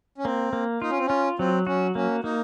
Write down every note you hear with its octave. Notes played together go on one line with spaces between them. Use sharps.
C#4
A#3 C4
A#3
D#4 F4
C#4
C4
C#4 F4
F#3 C4
C#4 F#4
A#3 C#4
A#3 D#4